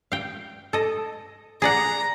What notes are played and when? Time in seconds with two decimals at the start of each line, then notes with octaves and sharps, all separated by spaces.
0.12 F5 G5
0.73 A4 D#5
1.62 G#4 D5 F#5 A#5